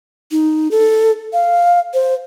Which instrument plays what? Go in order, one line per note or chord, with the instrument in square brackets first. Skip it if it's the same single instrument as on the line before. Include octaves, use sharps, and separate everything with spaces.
[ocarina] D#4
A4
F5
C5